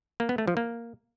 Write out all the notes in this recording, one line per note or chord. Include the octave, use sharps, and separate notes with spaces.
A#3
B3
A3
F3
A#3